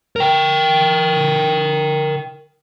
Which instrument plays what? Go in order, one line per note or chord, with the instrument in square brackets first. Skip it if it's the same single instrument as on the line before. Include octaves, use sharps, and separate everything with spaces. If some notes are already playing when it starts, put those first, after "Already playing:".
[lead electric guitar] A#4 G5